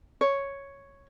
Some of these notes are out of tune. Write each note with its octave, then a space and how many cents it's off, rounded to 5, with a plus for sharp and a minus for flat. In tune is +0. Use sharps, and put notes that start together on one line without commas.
C#5 +0